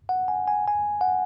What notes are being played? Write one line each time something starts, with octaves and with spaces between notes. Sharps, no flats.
F#5
G#5
G#5
G#5
F#5